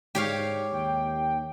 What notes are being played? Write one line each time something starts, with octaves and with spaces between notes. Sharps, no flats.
G#2 G4 C#5 F5
D#2 G5